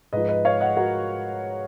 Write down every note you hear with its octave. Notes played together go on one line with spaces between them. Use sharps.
G#2 F3 B4 D#5
B4 D#5
C#5 F5
D#5 F#5
F#4 A#4